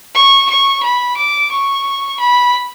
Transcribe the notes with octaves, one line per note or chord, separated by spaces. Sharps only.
C#6
C#6
B5
D6
C#6
B5